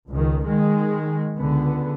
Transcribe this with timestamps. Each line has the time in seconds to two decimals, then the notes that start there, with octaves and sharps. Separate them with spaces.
0.10 C#2 D#3
0.44 D#3 G#3
1.37 C#2 D3 B3